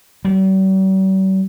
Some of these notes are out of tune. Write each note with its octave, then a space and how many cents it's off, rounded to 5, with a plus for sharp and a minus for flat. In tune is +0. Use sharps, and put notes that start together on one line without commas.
G3 -45